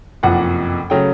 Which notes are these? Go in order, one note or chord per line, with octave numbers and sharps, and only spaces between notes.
F#1 F2 C3 F3 F#5
C#3 F#3 A3 G5